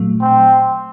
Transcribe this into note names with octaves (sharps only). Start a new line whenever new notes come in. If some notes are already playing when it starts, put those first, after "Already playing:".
Already playing: A#2 F#3 A3
C4